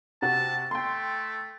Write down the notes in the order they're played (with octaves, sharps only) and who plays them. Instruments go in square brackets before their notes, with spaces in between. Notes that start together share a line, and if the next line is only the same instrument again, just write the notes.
[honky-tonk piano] C3 F#4 [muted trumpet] A5
[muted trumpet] A3 [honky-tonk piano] G5 C6